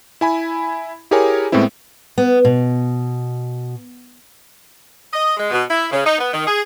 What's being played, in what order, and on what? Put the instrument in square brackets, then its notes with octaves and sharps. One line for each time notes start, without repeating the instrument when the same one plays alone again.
[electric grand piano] E4 G#5 B5
E4 G4 G#4 A#4 C#5 G#5
A2 G#3 B3 C4 E4
[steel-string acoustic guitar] B3
B2
[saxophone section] D#5
G#3
B2
E4
C#3
D#4
B3
D#3
G#4